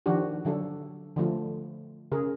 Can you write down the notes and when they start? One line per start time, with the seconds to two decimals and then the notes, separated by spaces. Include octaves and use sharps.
0.06 D#3 F3 D4 F#4 G4
0.45 D3 F#3 D4 A4
1.16 D3 F3 A3 F4
2.12 C#3 G#4 A#4